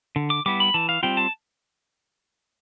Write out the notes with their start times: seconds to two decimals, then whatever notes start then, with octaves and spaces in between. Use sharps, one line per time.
0.16 D3
0.30 D6
0.46 G3 B3 E4 D6
0.60 B5
0.74 E3 A5
0.89 F5
1.03 G3 C4 F4 G5
1.17 A5